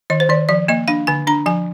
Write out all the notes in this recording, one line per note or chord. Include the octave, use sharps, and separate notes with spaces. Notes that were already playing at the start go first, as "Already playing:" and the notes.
D#3 D#5
C5
D#3 D5
F3 D5
A#3 D#5
D4 F5
D3 G#5
D4 A#5
F3 G#5